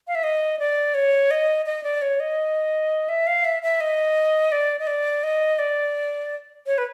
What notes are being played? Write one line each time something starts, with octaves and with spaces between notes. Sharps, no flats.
F5
E5
D#5
D5
C#5
D#5
D#5
D5
C#5
D#5
E5
F5
E5
E5
D#5
D5
D#5
D5
D#5
D5
C#5
B4